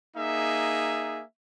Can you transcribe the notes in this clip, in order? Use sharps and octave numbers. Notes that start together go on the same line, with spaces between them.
A#3 D#4 G#4 E5